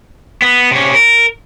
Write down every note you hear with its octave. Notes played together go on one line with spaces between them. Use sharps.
B3
C3 C#4
A#4